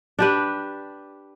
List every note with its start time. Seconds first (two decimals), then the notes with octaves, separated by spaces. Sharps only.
0.19 D4 G4 B4